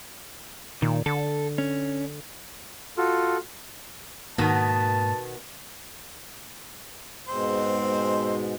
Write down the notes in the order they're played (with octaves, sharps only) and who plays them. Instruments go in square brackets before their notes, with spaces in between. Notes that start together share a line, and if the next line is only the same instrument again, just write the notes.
[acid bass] A#2 [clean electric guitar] D#3
[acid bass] D3 [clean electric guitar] A4
[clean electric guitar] C#4
[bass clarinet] F4 [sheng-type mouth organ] F#4 A4
[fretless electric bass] G#2 A#3 [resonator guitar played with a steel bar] B2 D#3 B3 [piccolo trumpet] A5
[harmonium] G#2 B2 G#3 [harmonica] C4 C5